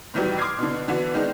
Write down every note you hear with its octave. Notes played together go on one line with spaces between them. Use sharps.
A2 D#3 E3 F#3 G3
C6 D6 D#6 F6 G#6 C7
B2 D3
D3 E3 B3 F#4
D#3 G#3 B3 D4